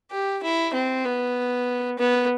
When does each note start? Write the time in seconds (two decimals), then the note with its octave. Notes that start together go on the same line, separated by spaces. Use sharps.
0.11 G4
0.43 E4
0.74 C4
1.05 B3
1.98 B3